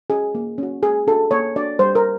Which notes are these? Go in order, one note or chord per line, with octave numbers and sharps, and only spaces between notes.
C#4 F#4 G#4
A#3
C#4 F#4
A#3 G#4
D4 F#4 A4
A#3 C#5
D4 F#4 D5
G3 C5
A#4